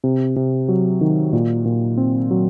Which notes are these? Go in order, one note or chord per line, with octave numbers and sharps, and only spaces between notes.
C3
C3
F#3
D#3
A#2
A#2
C4
F#3